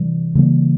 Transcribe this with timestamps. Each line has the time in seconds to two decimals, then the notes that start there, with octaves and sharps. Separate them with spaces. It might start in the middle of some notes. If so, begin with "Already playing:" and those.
Already playing: C3 E3 G3
0.35 C#3 E3 G3 A#3